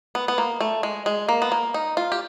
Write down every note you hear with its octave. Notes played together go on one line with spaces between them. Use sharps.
B3
B3
A#3
A3
G#3
G#3
A#3
B3
A#3
D#4
F4
G4